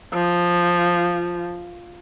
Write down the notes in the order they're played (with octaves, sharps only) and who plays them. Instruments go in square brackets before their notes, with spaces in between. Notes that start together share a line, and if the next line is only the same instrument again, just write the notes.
[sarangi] F3